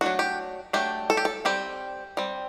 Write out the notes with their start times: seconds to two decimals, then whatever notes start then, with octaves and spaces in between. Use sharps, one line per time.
0.01 F#3 A3 D4 F#4
0.19 G4
0.73 F#3 A3 D4 G4
1.10 A4
1.17 G4
1.25 A4
1.45 G3 C4 G4
2.17 G3 C4